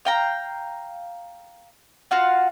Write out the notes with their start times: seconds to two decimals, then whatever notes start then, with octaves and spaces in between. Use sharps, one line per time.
0.05 F5 G5 A#5
2.11 F4 F#4 F5 F#5